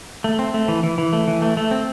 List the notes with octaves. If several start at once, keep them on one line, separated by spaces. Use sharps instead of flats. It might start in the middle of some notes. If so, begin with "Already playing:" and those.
A3
C4
A3
E3
E3
E3
A3
E3
A3
A3
C4